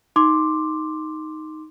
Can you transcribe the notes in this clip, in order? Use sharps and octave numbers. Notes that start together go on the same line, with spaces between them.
D#4 C6 D6